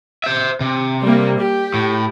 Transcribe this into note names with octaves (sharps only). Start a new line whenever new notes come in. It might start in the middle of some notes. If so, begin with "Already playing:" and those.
C5 E5
C3
G3 A#3
G4
A2